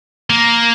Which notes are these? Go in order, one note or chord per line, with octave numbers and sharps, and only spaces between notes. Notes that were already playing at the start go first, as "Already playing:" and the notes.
A#3